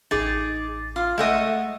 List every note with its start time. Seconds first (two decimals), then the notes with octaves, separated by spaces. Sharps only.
0.11 A1 D#4 G#4 D6 A6
0.96 F4
1.18 G#3 A3 D#5 E5 F#5